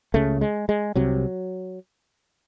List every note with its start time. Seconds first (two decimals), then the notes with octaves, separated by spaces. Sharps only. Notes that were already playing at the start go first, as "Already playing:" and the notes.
0.14 C#2 C#3 A3
0.41 G#3
0.69 G#3
0.95 C2 C3 F#3